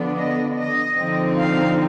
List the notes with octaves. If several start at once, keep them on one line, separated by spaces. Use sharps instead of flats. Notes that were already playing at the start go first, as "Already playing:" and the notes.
Already playing: D3 F3 B3 D4
D#5
D#5
D3 F3 C4 D#4
F5